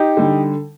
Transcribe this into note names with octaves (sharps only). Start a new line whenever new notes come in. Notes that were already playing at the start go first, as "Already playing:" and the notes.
Already playing: D#4 G4
D3 G3